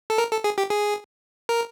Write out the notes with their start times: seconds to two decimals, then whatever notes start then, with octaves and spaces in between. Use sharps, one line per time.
0.10 A4
0.18 A#4
0.31 A4
0.44 G#4
0.58 G4
0.71 G#4
1.49 A#4